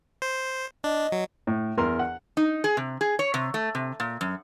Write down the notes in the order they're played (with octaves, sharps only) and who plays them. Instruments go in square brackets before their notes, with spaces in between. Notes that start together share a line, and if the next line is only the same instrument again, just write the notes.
[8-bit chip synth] C5
[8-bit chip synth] D4 [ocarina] D#5
[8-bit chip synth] F#3
[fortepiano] A2
E2 A#4 C6
F#5
[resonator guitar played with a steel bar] D#4
G#4
C3
G#4
C#5
C3
A3
C3
A#2
F#2